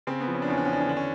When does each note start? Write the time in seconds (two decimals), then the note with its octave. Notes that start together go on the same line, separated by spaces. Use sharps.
0.07 C#3 C4
0.20 B3
0.27 F3
0.34 C#4
0.42 D4
0.48 E2 C#4
0.58 D4
0.65 C#4
0.68 E2
0.73 D4
0.81 C#4
0.88 D3 D4
0.97 C#4